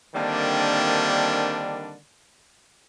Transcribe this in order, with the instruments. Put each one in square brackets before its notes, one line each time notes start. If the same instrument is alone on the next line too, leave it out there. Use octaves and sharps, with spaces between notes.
[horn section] D3 D#3 G3 A#3 C4 D4